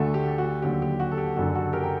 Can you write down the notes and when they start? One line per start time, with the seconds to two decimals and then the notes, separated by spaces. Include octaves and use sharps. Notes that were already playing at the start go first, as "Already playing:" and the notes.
Already playing: D2 D3 A3 F#4 A4
0.14 G4
0.38 F#4
0.62 D#2 D3 F#3 G4
0.82 G4
1.00 F#4
1.12 A4
1.18 G4
1.36 F#1 F#2 D3 F#4 A4
1.55 F#4 A4
1.73 G4 A#4
1.83 G5